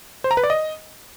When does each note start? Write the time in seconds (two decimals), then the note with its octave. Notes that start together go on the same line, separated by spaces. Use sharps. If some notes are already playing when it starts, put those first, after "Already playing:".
0.24 C5
0.31 A#5
0.37 B4
0.43 D5
0.50 D#5